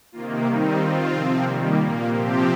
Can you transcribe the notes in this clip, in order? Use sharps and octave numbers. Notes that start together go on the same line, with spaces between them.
C3 D#3 A#3 F4
D#3 G3 C4 D#4
D#3 C4 F4
C3 F3 C4
D#3 G3 A#3
A#2 A#3
C3 F3 C4 G4